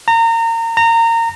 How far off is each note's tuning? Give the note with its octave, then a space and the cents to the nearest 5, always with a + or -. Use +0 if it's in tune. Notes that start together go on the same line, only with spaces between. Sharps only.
A#5 -30
A#5 -25